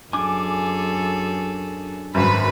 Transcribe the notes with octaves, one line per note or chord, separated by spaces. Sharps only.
F#2 D4 G#4 A4 G#5 D6
G#1 F#2 B4 B5